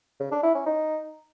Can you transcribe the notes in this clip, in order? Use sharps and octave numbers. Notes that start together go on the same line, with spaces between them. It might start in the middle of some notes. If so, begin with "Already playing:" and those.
C#3
D4
E4
C#4
D#4